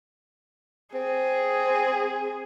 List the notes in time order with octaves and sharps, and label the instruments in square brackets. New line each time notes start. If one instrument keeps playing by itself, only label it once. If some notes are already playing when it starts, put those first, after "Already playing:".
[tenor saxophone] C4 [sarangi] G#4